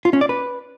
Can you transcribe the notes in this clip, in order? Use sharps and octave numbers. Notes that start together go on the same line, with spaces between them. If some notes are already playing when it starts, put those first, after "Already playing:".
F4
C#4
D5
B4